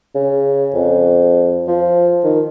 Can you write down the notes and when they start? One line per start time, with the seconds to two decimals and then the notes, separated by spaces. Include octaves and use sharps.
0.15 C#3
0.74 F2
1.67 F3
2.24 D#3